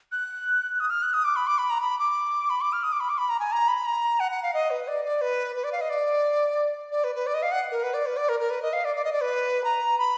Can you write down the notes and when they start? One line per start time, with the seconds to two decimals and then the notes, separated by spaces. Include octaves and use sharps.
0.12 F#6
0.80 D#6
0.90 F6
1.02 F#6
1.14 D#6
1.24 D6
1.36 B5
1.47 D6
1.58 B5
1.70 A#5
1.81 B5
1.99 D6
2.50 B5
2.61 D6
2.73 F6
2.84 D#6
2.92 D6
3.00 B5
3.09 D6
3.18 B5
3.30 A#5
3.40 G#5
3.52 A#5
3.68 B5
3.85 A#5
4.20 F#5
4.32 F#5
4.43 F5
4.54 D#5
4.70 B4
4.88 D5
5.05 D5
5.21 B4
5.56 B4
5.64 D5
5.72 F5
5.81 D#5
5.90 D5
6.92 D5
7.04 B4
7.15 B4
7.27 D5
7.34 D#5
7.43 F5
7.52 F#5
7.71 A#4
7.83 B4
7.94 D5
8.06 B4
8.17 D5
8.29 A#4
8.40 A#4
8.50 B4
8.62 D#5
8.73 F5
8.85 D5
8.96 D5
9.05 D#5
9.13 D5
9.22 B4
9.64 A#5
9.98 B5